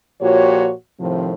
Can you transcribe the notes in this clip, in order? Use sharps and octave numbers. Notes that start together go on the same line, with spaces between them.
A#2 F3 F#4 G4 C#5
A2 C3 D#3 F3